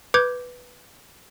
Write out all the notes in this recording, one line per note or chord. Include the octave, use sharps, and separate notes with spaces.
B4 D6 G6 G#6